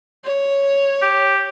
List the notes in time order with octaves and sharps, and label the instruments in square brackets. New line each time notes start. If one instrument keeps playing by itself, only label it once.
[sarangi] C#5
[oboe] G4